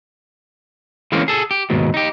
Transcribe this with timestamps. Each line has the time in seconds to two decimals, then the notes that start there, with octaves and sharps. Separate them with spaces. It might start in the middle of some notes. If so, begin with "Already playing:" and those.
1.12 E3 G#3 A#3 C4 C#4
1.28 G#4 A4
1.51 G4
1.70 D#2 G#2 B2
1.94 D#4 G4